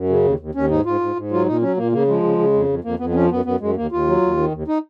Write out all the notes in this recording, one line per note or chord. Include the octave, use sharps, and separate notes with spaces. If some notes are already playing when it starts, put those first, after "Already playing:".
Already playing: F#2
C#3
D#2
D#2
D#2 C#4
G#2 D#4
G#2 F4
G#2
G#2
F#3 F4
A#2 D#4
F#3 C#4
A#2 A#3
C#3 A#3
F3 G#3
C#3
C#3
F2
F2
F2 A#3
F2 B3
B3
F3 C#4
F#2 B3
F#2 B3
F#2 G#3
D#2 A#3
D#2 F4
F#3
D#2
D#3
D#2
D#4